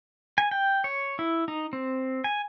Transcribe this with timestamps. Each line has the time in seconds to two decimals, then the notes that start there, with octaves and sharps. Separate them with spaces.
0.38 G#5
0.51 G5
0.84 C#5
1.19 E4
1.48 D#4
1.73 C4
2.24 G#5